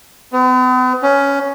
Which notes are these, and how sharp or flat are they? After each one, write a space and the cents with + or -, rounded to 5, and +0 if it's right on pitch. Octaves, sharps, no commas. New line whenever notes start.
B3 +45
C#4 +10